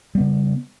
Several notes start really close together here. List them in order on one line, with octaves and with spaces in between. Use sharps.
G3 B3 C#3